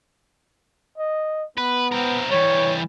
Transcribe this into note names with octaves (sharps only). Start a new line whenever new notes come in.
D#5
B3 B4
C4 A#4
E3 G3 C#5